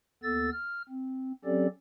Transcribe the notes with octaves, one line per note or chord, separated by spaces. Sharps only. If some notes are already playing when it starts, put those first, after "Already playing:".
D#2 B3 A4 E6 A6
F6
C4
F#3 C4 C#4 G4 A4 D5